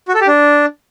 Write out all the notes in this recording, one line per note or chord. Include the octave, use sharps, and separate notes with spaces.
F#4
A4
G4
D4